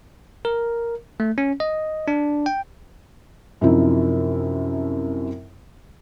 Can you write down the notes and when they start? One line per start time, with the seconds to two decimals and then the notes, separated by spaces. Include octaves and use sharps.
0.45 A#4
1.20 A3
1.38 C#4
1.60 D#5
2.08 D4
2.46 G5
3.61 F#2 C3 F3 D#4 E4